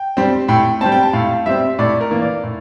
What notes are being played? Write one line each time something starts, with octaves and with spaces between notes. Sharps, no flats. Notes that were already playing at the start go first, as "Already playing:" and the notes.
Already playing: G5
G3 C4
A2 G5
G3 C4 A5
G5
A5
A2 F5
G3 C4 E5
A2 D5
A#4
E3 A#3
D5
A2